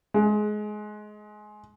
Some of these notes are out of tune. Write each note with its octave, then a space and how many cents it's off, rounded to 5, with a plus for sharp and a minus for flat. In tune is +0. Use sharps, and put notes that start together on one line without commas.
G#3 +20